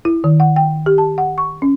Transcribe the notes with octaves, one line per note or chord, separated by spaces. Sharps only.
E4
D#3
F#5
G5
G4
A5
F#5
C#6
C#4